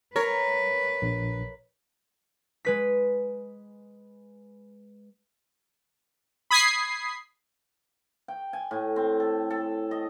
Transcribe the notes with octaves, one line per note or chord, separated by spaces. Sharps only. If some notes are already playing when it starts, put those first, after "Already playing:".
A#4 B4 C#5
A#1
G#3 B4 B6
B5 D#6 G#6 B6 C7
G5
G#5
A2
C4
A4
A4
D#5